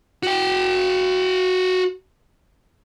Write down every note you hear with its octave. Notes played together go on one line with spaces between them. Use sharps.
F#4 G5